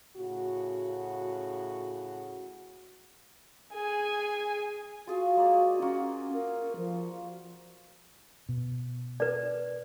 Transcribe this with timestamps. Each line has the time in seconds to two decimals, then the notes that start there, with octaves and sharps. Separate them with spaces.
0.16 A2 C#3 F#4
3.73 G#4 G#5
5.07 F4 F#4 G#4 F5
5.37 G#3 A#3 D5
5.82 A#3 C#4 F4 F#4
6.33 A#4
6.77 F3
8.49 B2
9.20 B4 D5